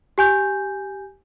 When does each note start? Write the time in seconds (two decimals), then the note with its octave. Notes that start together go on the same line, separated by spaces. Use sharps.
0.18 G4 G#5 G6